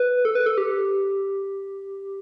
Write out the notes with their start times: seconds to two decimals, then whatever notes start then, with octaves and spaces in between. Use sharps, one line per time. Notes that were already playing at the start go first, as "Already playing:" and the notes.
Already playing: B4
0.25 A4
0.35 B4
0.46 A4
0.58 G4